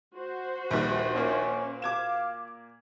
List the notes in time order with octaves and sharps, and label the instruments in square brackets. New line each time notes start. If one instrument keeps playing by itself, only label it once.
[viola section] F#4 C5
[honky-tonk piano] A#1 D#2 [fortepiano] G3 B4
[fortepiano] A#2 A#3 [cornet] C#4
[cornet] F5 [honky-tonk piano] D6 G#6 E7